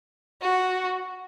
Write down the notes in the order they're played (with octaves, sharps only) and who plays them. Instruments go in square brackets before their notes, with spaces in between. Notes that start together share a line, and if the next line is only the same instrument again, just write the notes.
[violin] F#4